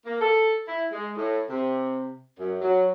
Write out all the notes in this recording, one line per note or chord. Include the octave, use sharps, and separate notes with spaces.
A#3
A4
E4
G#3
A2
C3
F#2
F#3